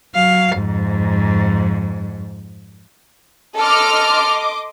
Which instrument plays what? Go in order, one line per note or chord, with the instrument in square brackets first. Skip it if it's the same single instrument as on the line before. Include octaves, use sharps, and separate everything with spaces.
[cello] F#3 F5
F2 G#2
[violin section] A4 F6 [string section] D#5 C6 D6